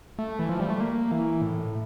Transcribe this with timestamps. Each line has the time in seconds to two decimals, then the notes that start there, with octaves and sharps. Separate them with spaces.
0.19 A3
0.39 E3
0.49 F3
0.60 G3
0.70 A3
0.80 A#3
1.12 E3
1.42 A2